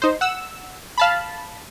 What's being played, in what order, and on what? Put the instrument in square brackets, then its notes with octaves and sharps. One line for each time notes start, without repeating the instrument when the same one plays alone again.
[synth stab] D#4 C5
F#5 E6
F5 A5 B5